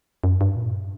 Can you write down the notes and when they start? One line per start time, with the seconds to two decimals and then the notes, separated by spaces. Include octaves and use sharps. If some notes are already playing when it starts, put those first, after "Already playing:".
0.24 F#2
0.41 G2
0.56 A#2
0.72 G2